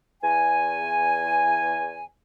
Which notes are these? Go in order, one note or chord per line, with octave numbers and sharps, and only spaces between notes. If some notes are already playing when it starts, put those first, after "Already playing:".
E2 G#5